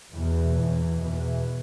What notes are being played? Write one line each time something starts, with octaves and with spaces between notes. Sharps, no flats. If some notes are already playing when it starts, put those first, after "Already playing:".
E2 B2 E3
E2 B2
E2 B2 E3